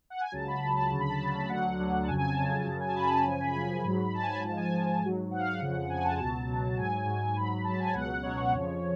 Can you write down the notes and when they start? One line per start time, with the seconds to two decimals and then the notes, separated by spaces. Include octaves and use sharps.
0.10 F#5
0.21 G#5
0.32 C#2 C#3 F#3 A5
0.47 B5
0.62 C#2 C#3 F#3 A5
0.77 A5
0.91 D2 C#3 F#3 A5
1.00 B5
1.09 A5
1.20 D2 C#3 F#3
1.49 D2 D3 F#3 F#5
1.79 D2 D3 F#3
2.03 A5
2.08 F2 C#3 F#3 G#5
2.18 G#5
2.28 A5
2.38 F2 C#3 F#3
2.66 F#2 C#3 F#3
2.80 G#5
2.88 A5
2.96 F#2 C#3 F#3 B5
3.11 A5
3.25 F#2 C#3 F3 G#5
3.41 B5
3.54 F#2 C#3 F3 B5
3.84 G#2 F#3
4.05 B5
4.13 G#2 F#3 A5
4.23 G#5
4.32 B5
4.43 G#2 F3 A5
4.57 G#5
4.72 G#2 F3
5.01 G#2 F#3
5.30 G#2 F#3 F#5
5.39 F5
5.50 F#5
5.59 F2 C#3 F3
5.89 F2 C#3 F3 G#5
6.04 A5
6.19 C#2 B2 F#3 A5
6.47 C#2 B2 F#3
6.77 G#2 F#3 G#5
7.06 G#2 F#3
7.35 G#2 F#3 B5
7.64 G#2 F#3 A5
7.79 G#5
7.94 C#2 B2 F#3 F#5
8.23 C#2 B2 F#3 C#5
8.52 F2 C#3 F3